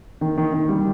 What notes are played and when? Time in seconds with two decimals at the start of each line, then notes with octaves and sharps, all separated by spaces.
0.21 D#3
0.37 D#3
0.53 D#3
0.69 G3